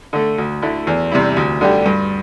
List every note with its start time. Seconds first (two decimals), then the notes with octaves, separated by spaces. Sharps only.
0.13 D3 A3
0.38 D2
0.62 D3 A3 E4
0.87 E2
1.12 C3 G3 E4
1.37 D2
1.61 D3 G3 D4 G4
1.86 G2